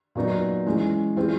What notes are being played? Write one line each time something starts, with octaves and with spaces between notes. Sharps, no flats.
A#2 F#3 B3 D#4
E3 G#3 C#4
E3 G3 C4 F4 G#4